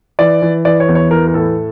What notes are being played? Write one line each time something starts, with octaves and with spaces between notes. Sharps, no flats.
E3 D5
E3
E3 D5
C#5
E2
C#5
E3 A#4
A#4
A2 A4